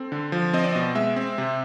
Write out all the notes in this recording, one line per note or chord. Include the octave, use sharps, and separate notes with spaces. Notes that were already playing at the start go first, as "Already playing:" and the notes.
Already playing: C4 A4
D3
F3
C4 D#5
D5
B2 D#5
G#3 E5
C4
C3